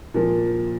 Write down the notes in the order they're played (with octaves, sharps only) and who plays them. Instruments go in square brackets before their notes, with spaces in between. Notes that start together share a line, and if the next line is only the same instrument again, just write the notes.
[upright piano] A#2 F3